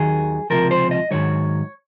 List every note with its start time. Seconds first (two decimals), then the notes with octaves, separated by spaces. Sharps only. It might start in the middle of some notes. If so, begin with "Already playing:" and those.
Already playing: D#2 D#3 F#3 G#4
0.50 C#2 C3 F3 A#4
0.71 C5
0.91 D#5
1.11 G#2 D#3 F#3 C#5